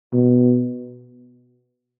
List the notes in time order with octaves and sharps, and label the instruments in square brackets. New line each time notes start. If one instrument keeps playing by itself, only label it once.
[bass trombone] B2